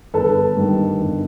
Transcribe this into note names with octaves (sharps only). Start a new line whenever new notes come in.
G1 A4 B4
G2 D#3
G1